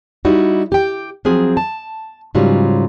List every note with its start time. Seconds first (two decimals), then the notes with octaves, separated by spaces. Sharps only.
0.25 G3 D#4 E4 F#4
0.72 G4 G5
1.25 F3 F#3 C4 G#4
1.57 A5
2.35 G#2 C#3 F#3 G3 F4